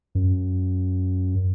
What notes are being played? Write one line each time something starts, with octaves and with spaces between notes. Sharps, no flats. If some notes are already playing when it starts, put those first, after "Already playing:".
F#2